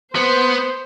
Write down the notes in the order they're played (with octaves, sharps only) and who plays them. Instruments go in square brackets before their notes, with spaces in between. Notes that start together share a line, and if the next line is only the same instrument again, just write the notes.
[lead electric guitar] B3 [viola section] C5